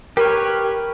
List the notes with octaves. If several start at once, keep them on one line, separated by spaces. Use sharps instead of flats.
G4 A#4 B4 C#5